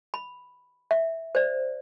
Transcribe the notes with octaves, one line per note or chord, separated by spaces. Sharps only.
B5
E5
C5 D5